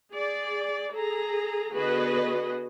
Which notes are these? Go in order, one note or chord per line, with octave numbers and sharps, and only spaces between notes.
G#4 D5
G#4 A4 A#5
D3 B3 F#4 G#4 B4 D#5